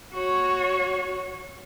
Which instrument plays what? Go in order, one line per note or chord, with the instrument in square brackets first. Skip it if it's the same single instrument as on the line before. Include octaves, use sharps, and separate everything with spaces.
[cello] F#4 C#5